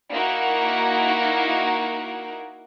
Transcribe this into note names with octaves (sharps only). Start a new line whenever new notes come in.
A#3 D#4 E4 F#4 A#4